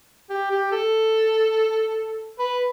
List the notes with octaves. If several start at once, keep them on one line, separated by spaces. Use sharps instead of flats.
G4
G4
A4
B4